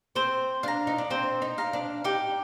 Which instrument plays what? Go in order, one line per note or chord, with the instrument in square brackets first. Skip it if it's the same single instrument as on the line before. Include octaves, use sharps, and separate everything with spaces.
[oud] C4 [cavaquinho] C5
[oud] D4 [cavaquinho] F5 A#5
[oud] D#4
D4
[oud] C4 [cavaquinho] C5
[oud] D#4
[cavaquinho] F5 A#5
[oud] D4
[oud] D#4 [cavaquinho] G4